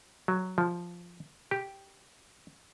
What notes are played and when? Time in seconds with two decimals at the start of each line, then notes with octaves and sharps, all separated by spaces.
0.28 F#3
0.58 F3
1.51 G4